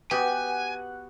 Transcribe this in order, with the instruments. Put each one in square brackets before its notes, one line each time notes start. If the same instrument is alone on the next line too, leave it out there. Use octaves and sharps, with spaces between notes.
[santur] B3 F#4 F#5 [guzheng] G4 [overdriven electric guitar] G#5